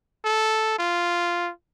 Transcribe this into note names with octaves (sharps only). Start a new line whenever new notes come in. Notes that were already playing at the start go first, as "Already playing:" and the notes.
A4
F4